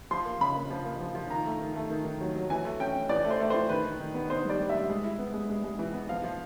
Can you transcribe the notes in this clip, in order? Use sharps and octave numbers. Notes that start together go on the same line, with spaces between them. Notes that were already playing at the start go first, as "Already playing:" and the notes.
F3 C6
A#3
C#3 B5
A#3
F3
A#3
F3
F3
D#3 A#5
A3
D#3
A3
D#3
D#3
F#3
F#3
E3 G#5
A3
C#4 G5
C#4
E3 D5
A3
C5
A3
E3 C5
D#3 B4
D#3
D#3
B3
D#4 C5
G3 D5
G3
G3 E5
G#3
E4
B3
G#3
G#3
G#3
E3
B3
F3 F5
F3